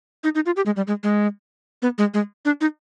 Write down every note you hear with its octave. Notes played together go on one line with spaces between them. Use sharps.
D#4
D#4
F4
G4
G#3
G3
G#3
G#3
B3
G#3
G#3
D4
D#4